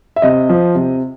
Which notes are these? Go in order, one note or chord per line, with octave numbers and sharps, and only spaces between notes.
E5
C3 D#5
F3
C3